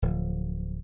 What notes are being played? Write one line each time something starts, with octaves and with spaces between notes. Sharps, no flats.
D1 F3